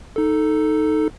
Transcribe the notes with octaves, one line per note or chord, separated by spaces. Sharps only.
D#4 A4